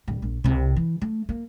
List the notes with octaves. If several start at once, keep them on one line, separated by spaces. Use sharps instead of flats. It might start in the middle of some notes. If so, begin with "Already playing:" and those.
D1 G3
A#1
C2 C3
E3
A3
A#3